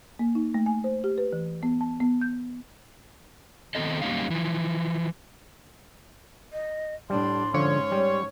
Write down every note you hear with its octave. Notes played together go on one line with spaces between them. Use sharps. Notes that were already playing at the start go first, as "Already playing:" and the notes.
A#3
D#4
A3
G#5
C5
G4
B4
E3
B3
A5
B3
G6
D#3 F3 B3 C4 A4 D#5
F#2 G3 A#3 C#4 D#4 F5
E3 F3
D#5
A2 G3 D4 C6
G#2 D3 F3 C#4 C#5
G3